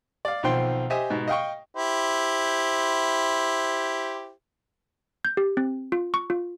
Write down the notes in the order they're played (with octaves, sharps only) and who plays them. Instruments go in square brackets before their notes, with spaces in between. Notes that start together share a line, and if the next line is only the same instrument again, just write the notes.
[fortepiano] D5 F5
B1 D#3 F3 C4 G5 C6
G4 C5 D#5 E5 G#5
G#2 B2
D#5 F5 G5 C#6
[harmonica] E4 G4 C5
[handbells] G6
G4
C4
F4
C#6
F4